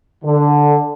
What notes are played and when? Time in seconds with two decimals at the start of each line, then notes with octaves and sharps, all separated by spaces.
0.24 D3